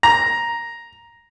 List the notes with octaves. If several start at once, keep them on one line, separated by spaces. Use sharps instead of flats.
A#5